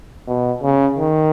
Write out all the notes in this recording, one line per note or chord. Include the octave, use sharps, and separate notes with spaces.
B2
C#3
D#3